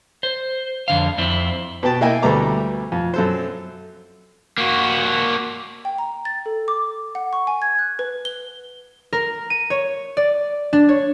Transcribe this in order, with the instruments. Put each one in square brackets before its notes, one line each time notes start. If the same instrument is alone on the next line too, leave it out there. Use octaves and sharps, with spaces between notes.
[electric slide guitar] C5
F2 D3 F5
F2 C4 E4
[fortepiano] B2 B3 G5 A5
A#3 E4 D#5 G5 G#5
D2 G3 A3 B3 A#5 D6
F2
F#2 A4 C5
[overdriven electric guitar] A#3 F#4
[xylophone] G5
A#5
A6
A4
D6
F#5
C#6
G#5
G#6
F#6
B4
G7
[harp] A#4
D#7
C#5
D5
D4
C#5